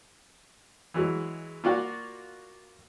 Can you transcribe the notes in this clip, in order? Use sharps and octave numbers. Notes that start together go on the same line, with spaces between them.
E3 F#3 G#3
A#3 F4 F#4 D5 F#5